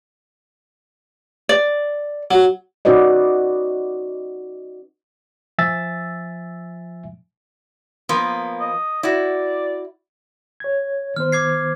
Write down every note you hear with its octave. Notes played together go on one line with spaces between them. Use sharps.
D5
F#3
C#4 D#4 F#4 B4 D5 D#5
F3 E5 G#5 E6 A6
F3 A#3 B3
D#5
E4 F#4 D5
C#5 G#6
D#3 B3 C5 F6
D6 G#6 C7